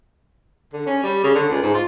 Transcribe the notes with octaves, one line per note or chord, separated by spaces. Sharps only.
D3
C#4
G3
C#3
D3
C#2
G#2
F4